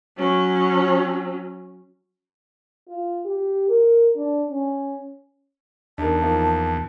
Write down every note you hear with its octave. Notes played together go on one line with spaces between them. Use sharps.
F#3 C#4
F4
G4
A#4
D4
C#4
E2 D4 D#4 A#4 A5
F3 A#3 D#4